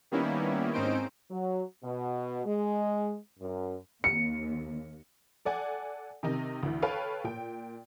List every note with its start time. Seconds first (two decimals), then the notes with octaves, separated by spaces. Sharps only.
0.11 D#3 G3 A#3 B3 C#4 E4
0.73 G#2 C4 C#4 D#4 C5 D7
1.29 F#3
1.83 B2
2.45 G#3
3.40 F#2
4.04 D#2 C#7
5.45 A4 D5 F#5 G#5
6.23 C3 D#3 D#4
6.63 D2 E3
6.82 A4 B4 C#5 F5 G5
7.24 A#2 G5